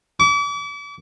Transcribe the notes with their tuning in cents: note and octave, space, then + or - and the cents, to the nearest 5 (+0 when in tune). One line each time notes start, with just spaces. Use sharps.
D6 -40